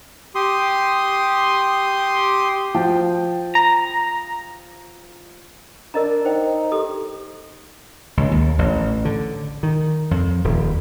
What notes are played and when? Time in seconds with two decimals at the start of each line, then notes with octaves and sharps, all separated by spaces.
0.35 G4 C6 D#6
2.74 F3 G5
3.55 A#5
5.94 D4 A#4 D#5 A#5
6.25 D#4 C5 G5
6.72 G4 A4 D#6
8.17 C#2
8.31 D#2
8.59 A1
9.05 D3
9.63 D#3
10.11 F2
10.44 D#1